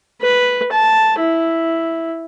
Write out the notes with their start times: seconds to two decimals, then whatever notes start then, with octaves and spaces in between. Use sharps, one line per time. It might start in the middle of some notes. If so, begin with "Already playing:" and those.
0.21 B4
0.72 A5
1.19 E4